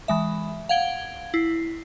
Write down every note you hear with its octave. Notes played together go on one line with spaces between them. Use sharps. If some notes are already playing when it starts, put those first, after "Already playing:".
E3 G#3 E5
F5 F#5 G#6 D7 G7
E4 C7